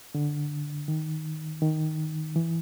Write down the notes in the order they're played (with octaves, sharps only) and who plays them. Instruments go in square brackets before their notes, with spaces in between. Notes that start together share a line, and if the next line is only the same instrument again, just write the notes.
[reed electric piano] D3
D#3
D#3
E3